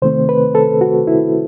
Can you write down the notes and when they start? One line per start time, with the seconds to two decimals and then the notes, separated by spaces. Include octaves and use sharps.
0.02 C3 D#3 A3 C4 C5
0.29 B4
0.55 A4
0.81 F#4
1.07 E4